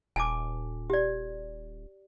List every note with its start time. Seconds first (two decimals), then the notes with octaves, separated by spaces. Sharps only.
0.16 D#1 G#5 A5 D6
0.90 G4 D5